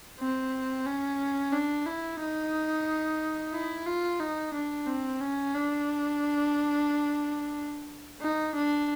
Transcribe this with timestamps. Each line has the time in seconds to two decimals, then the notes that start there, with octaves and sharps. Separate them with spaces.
0.19 C4
0.86 C#4
1.53 D4
1.86 E4
2.20 D#4
3.53 E4
3.87 F4
4.20 D#4
4.54 D4
4.87 C4
5.21 C#4
5.55 D4
8.22 D#4
8.55 D4